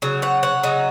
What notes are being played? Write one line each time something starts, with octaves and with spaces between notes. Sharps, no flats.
C#3 F#3
C#5 F#5
C#5 F#5
C#3 F#3 D#4